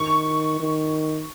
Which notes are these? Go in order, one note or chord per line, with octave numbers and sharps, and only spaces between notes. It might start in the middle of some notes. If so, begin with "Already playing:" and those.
Already playing: D#3 C#6
D#3